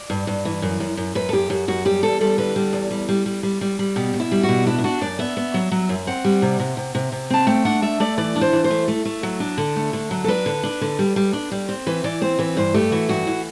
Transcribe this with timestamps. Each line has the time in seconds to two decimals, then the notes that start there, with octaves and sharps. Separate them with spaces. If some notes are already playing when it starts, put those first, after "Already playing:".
Already playing: D5
0.10 G2
0.27 G2
0.45 E3
0.62 F#2
0.80 F#2
0.97 F#2
1.15 F#2 B4
1.29 A4
1.33 F#2 G4
1.50 F#2 F#4
1.68 F#2 F#4
1.85 G3 G4
2.03 E2 A4
2.21 G3 A4
2.38 D3 B4
2.56 G3
2.73 E2
2.91 G3
3.09 G3
3.26 G3
3.43 G3
3.61 G3
3.79 G3
3.96 B2 G4
4.14 B2
4.20 E4
4.32 G3
4.43 F#4
4.49 B2
4.67 D4 E4
4.78 E4
4.84 D4 F#4
5.01 F#2 D5
5.19 B3 E5
5.37 B3
5.54 F#3
5.72 F#3
5.89 F#2
6.07 C4 F#5
6.25 G3
6.42 C3
6.60 C3
6.77 C3
6.95 C3
7.12 C3
7.30 C4 A5
7.47 A3 G5
7.65 D4 F#5
7.82 A3 E5
8.00 A3 D5
8.18 E3 D5
8.36 D4
8.41 C5
8.53 E3
8.64 C5
8.70 A3
8.88 A3
9.05 A3
9.23 F#3
9.40 D4
9.58 D3
9.76 A3
9.93 D3
10.11 F#3
10.24 A4
10.28 D4 B4
10.46 D3
10.63 D4
10.81 D3
10.99 G3
11.16 G3
11.33 D4
11.51 G3
11.69 C4
11.87 E3 B4
12.04 E3 D5
12.21 C4 C5
12.39 E3 B4
12.57 G2 C5
12.74 A3 G4
12.92 E3 F#4
13.09 G2 F#4
13.27 E3